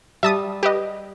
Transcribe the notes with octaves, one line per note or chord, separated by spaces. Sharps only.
G3 E5 A5 D#6
G4 B4 D#5